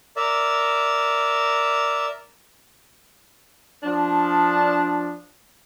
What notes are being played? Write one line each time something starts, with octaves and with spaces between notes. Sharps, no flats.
A#4 D5 E5
F3 D4